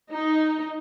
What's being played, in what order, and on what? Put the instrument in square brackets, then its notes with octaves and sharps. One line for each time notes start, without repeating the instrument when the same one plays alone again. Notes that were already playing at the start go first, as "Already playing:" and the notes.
[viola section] D#4